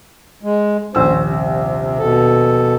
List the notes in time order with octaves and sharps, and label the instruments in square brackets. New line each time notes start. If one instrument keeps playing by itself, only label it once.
[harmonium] G#3
[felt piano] D#1 A#1 E6 [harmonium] C#4 C5
[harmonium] C3
B2 A4